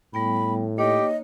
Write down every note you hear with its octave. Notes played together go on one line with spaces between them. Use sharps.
A2 G3 B3 G5 B5
A#3 D#4 G4 C#5 D#5